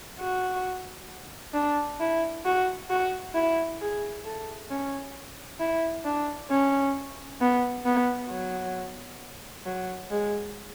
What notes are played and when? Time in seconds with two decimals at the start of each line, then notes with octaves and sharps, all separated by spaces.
0.20 F#4
1.54 D4
2.00 E4
2.45 F#4
2.90 F#4
3.35 E4
3.81 G#4
4.25 A4
4.71 C#4
5.60 E4
6.05 D4
6.51 C#4
7.41 B3
7.86 B3
8.30 F#3
9.66 F#3
10.11 G#3